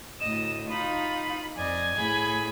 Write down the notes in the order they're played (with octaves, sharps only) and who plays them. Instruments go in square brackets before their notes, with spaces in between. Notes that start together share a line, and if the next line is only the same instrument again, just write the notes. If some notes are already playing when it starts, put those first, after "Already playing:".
[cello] D2 A2 [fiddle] D#5 [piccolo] E7
[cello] D#4 F4 [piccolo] B5 [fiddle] D#6
[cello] F2 [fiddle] D5 D#5 [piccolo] G#5
[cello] A2 [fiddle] G#4 B5